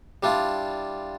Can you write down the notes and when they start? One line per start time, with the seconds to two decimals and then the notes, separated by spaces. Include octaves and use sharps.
0.23 G3 D4 E4 F4